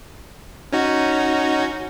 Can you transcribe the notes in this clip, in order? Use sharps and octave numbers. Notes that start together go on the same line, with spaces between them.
C#4 D#4 F#4